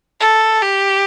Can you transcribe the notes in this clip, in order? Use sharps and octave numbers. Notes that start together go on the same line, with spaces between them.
A4
G4